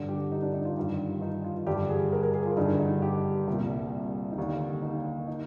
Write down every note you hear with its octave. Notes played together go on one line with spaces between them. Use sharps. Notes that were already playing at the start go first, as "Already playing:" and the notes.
Already playing: G2 D3
G4
D#4
D4
D#4
F4
G2 D#3 F4
D#4
F4
G2 D3 G4
G#4
A#4
A#4
G#4
F4
G2 D3 D#4
D#4
G4
C2 A#2
D#4
D#2 D3 D4
D#4
D#4